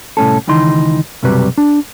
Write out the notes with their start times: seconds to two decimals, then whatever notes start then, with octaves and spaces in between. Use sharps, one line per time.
0.17 C2 A2 C#4 A4
0.47 C#2 D#3 E3 D#4 C6
1.23 B1 F#2 C3 F#3 G3 B4
1.58 D4